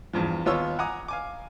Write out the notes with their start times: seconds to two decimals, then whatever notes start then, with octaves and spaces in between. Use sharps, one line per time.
0.13 E2 G2 F3
0.46 D#2 B3 F4 C#5 E6
0.79 F#5 G#5 A#5 D6 D#6
1.08 F5 G#5 D6